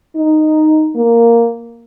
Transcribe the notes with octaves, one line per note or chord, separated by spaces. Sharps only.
D#4
A#3